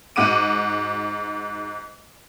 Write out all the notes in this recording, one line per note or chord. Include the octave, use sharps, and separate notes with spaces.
G#2 F#4 D6 D#7